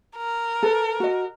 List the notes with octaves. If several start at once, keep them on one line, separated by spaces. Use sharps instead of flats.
A#4
A4 B4
F#4 D#5